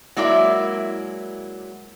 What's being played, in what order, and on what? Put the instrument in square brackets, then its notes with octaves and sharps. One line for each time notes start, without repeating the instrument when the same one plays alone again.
[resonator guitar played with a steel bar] F#3 G#3 A#3 E4 D5 E5